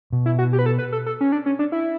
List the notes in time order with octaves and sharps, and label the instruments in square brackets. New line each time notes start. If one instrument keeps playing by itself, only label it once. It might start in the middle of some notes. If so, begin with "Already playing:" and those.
[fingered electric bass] B2
[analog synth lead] E4
F#4
G4
B4
A4
B4
A4
A4
C#4
D4
C#4
D4
E4